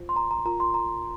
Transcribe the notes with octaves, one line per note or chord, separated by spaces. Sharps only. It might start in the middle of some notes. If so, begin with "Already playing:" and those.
Already playing: F4 C5
C6
A#5
A#5
F4 A#4 A#5
C6
A#5